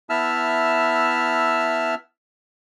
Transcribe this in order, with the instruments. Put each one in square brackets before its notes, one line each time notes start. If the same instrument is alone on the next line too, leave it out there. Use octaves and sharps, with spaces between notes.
[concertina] B3 E4 E5 A5 E6 F6